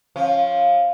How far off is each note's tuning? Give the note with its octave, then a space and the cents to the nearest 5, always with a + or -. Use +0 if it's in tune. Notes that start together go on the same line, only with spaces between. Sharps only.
F3 +0 C#4 -15